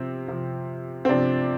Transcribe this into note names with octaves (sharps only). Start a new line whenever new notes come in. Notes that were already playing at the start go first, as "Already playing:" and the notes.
Already playing: C3 F3 C4
C3 F3
C4
C3 F3 D4